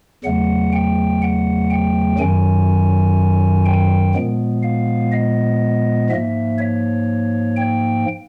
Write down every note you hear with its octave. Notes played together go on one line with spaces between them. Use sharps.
E2 C#3 F#3 A3 F#5
G5
F#5
G5
F#2 D#3 F#3 G#5
G5
A#2 F3 G#3 B3
F5
D#5
G#2 F3 A#3 E5
C#5
G5